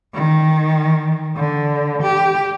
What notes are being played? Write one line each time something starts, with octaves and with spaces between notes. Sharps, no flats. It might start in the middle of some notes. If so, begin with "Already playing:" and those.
D#3
D3
G4